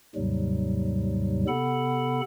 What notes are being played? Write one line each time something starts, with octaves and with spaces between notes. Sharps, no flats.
D#2 G#2 C3 F#3 G3
C3 B3 A4 F#5 B5